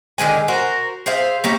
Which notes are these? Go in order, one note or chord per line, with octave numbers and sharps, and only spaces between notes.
D3 D#3 G#3 G#5
F#4 A#4 C5
G#4 C5 E5 F5
G3 A#3 C#4